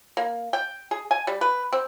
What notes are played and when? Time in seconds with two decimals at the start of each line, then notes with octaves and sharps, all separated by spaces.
0.17 A#3
0.53 G5
0.91 G#4
1.11 G#5
1.27 G3
1.41 B4
1.73 C4